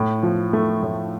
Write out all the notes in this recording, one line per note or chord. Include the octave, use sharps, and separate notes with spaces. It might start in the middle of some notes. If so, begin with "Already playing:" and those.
Already playing: A2
F3
A3
A2